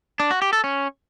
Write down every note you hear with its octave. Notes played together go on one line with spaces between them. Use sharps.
D4
F#4
G4
A4
C#4